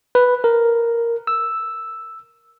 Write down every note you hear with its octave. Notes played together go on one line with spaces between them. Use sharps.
B4
A#4
E6